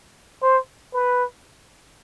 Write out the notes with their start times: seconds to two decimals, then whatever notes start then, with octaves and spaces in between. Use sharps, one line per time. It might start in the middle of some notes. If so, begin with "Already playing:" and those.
0.43 C5
0.93 B4